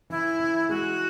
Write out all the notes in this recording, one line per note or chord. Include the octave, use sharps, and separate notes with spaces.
E3 E4
E3
G#3 F#4